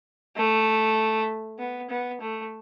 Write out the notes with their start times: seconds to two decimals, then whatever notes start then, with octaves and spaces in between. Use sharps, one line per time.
0.36 A3
1.59 B3
1.90 B3
2.20 A3